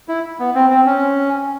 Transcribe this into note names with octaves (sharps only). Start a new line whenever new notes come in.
E4
B3
C4
C4
C#4